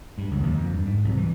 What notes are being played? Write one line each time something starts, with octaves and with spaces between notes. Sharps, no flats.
G2
C#2
D#2
F2
G2
G#2
C2
E3